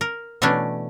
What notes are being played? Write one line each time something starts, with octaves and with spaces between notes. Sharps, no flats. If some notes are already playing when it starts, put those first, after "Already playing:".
A#4
B2 E3 A3 C#4 D4